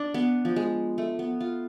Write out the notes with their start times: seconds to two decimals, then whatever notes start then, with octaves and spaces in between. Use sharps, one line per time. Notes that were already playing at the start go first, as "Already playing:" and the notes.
Already playing: D4
0.14 B3
0.45 F3
0.56 G#3
0.98 A3
1.19 B3
1.41 F4